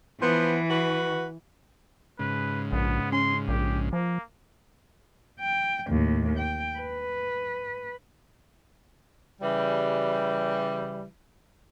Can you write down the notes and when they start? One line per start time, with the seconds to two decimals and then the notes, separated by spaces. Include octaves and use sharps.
0.21 E3 F3 B3
0.69 F#4 B4
2.19 G#2 C#3 B4
2.72 A#1 B3
3.12 C#4 C6
3.48 A#1 G4
3.93 F3 A#3
5.40 G5
5.89 D#2 A2
6.37 G5
6.79 B4
9.41 C#3 E3 G3